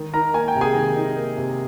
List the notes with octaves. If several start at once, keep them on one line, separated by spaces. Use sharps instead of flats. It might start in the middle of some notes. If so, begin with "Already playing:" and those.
Already playing: D#3
D#4 A#4 A#5
A#3 G#5
G5
C3
G#4 G#5
D#3
D#4
A#3
C3